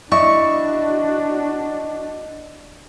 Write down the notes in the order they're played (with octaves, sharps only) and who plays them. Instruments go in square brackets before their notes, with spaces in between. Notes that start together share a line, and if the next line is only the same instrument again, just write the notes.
[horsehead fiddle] D4 F#4 [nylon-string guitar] E4 [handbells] D5 D#5 [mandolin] C#6